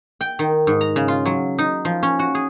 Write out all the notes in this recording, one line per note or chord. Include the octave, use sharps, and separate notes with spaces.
G5
D#3
G#2
A#5
C#3
F4
F#3
D#4
F3
C#4
F#4
G#4